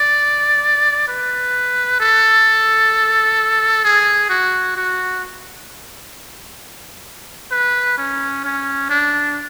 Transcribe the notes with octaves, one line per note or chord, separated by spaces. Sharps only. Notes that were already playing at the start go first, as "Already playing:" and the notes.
Already playing: D5
B4
A4
G#4
F#4
F#4
B4
C#4
C#4
D4